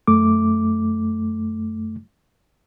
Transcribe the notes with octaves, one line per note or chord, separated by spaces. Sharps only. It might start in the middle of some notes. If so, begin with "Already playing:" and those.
F#2 A3 D6